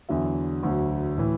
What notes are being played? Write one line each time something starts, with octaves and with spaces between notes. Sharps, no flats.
E2 D3 F#3 E5
D2 D3 F#3
A2 E3